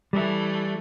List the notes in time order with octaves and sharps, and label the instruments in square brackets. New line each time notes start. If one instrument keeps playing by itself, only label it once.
[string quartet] E3 A3 [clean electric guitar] G3